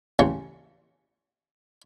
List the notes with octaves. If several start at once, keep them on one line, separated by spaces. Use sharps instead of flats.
A1 C#3 C#6